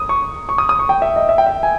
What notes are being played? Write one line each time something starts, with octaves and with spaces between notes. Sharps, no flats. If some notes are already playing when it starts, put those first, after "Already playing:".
Already playing: D#6
C#6
C#6
D#6
D#6
C#6
G5
E5
D#5
E5
G5
E5
G#5